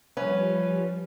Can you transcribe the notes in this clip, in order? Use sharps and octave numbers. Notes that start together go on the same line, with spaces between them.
F3 G3 C#4 B4